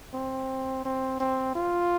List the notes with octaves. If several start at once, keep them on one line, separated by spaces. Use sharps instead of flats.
C4
C4
C4
F4